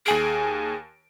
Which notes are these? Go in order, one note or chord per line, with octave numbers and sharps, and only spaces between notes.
D#2 G#4 G#5 D7